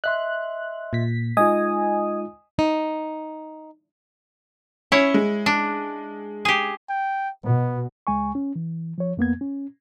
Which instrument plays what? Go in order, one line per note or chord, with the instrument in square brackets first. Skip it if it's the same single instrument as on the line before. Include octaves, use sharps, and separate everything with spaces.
[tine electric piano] D#5 E5 C6 [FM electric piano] F#6
[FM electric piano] A#2 B6
[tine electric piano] G#3 D#4 F4 [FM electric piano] D#5 G#5 D#6
[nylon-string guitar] D#4
[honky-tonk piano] C#4 [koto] E4 C#5
[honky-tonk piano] G#3
[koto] D4
G4 G#4
[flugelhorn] G5
[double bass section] B2 [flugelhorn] B3
[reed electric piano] C#2 G#3 G#5 C#6
C#4
E3
F3 C#5
F2 A#3 B3 G#6
C#4